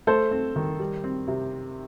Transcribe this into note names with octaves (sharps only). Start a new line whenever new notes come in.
A3 A4 C5
C4
D#3
G3
C4
C3